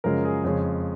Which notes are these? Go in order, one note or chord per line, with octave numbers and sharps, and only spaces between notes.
F#2 C#3 F3 G#3 A#4
G#4
F2 C#3 G#3